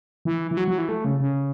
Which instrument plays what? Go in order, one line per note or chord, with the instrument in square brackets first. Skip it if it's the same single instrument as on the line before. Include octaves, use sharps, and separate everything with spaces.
[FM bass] E3
E3
F#3
F#3
E3
A3
C#3
C#3